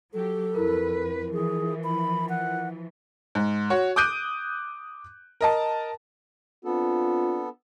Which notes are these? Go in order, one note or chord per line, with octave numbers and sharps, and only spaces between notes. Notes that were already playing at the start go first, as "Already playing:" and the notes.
F#3 G4 A4
F2 E4 A#4 B4
E3 F3 G#4
B5
F#5
G#2
F#4 C#5
D6 D#6 F#6 G6 D7 D#7
A#4 D#5 A5
B3 C4 D4 F4 A4